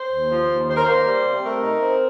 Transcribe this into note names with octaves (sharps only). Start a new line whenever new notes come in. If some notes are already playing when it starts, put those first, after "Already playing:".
Already playing: C5
D#2
F3
D#2
D#3 C5
A#4
A#3 C5
G3
C3
A3 A#4
D#4
C4